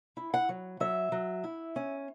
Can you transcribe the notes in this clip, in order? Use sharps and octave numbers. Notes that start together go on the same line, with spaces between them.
E4
F#5
F#3
F#3 E5
F#3
E4
C#4